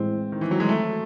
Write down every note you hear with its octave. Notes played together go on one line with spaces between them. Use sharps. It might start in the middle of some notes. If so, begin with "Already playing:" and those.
Already playing: A2 E3 G#3 C4
D#3
E3
F#3
G#3
A3